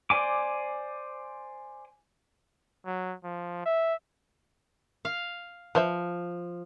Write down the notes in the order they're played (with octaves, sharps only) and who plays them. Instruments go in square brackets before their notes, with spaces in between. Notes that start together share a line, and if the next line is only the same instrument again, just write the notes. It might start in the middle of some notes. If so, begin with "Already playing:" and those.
[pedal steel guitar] C5 D5 G#5 D6
[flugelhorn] F#3
F3
E5
[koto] F5
[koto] F3 [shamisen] B4 C5 E5